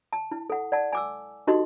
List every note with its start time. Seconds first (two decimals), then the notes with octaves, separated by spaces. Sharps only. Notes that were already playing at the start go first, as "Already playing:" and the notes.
0.13 A5
0.31 E4
0.50 A4 F#5
0.72 D5 F#5 A5
0.93 G#5 D6 E6
1.47 D#4 F#4 G4 A4 D#5 C6